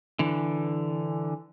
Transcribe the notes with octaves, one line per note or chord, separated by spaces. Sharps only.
D3 E3